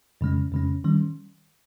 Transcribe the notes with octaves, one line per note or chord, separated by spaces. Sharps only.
F2 C#3 G#3 C#4
F2 C#3 G#3 C#4
D#3 G3 C#4